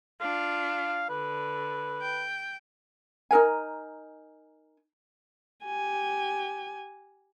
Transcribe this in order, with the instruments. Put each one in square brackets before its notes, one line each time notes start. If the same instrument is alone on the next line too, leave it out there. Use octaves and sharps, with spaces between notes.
[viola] D4 F4 [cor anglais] F5
[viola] D3 [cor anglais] B4
[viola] G5
[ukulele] D#4 A4 A#4 G#5
[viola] G4 G#5